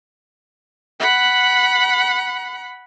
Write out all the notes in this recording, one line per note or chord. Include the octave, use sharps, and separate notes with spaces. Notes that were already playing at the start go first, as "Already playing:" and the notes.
F#5 B5